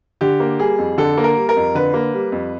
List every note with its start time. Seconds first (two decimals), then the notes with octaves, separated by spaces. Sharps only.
0.21 D3 G4
0.40 A#3
0.59 G3 G#4
0.78 F2
0.98 D3 A4
1.17 A#3
1.24 A#4
1.36 G3
1.49 A#4
1.56 F2
1.75 D3 B4
1.94 A#3
2.14 G3
2.32 F2